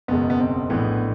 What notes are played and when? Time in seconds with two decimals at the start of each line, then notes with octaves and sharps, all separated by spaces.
0.08 F#1 E2 B2 G#3 B3
0.30 B3
0.39 C4
0.70 A#1 A2 E3 G#3 B3